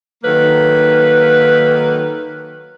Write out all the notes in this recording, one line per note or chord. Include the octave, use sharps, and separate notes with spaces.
D#3 F#3 A#3 A4 B4